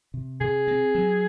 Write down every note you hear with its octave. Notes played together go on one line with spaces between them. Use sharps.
C3
C3 G#4
C4
F#3